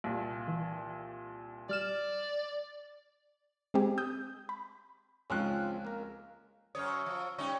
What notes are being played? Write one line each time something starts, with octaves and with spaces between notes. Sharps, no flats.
C2 A#2
E3
G3 D5 F6 E7
G#3 C4 G4 G#4
D#6 E6 G6
B5
C#2 F3 C4 C#4 F#6
A#3 A#4
F#2 C#5 D#6 F6
C#6 E6
F3
G3 C#4 D#4 C#5 C#6